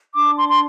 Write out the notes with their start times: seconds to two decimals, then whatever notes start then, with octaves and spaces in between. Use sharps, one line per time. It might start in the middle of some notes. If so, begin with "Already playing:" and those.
0.15 D4 D6
0.37 C6
0.49 C6